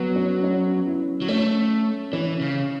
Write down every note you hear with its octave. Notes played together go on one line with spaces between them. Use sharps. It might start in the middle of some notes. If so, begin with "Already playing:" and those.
Already playing: F#3 B3
C#4
C#4
E4
F#3
A3 C#4
E3 C#4
C#3